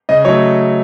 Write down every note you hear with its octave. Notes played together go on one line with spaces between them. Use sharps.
C#3 D#5
F#3 A3 C#5